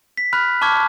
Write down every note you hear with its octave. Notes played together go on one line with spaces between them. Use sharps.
B6
B5 F6 F#6
A5 C#6 D6 F6 G#6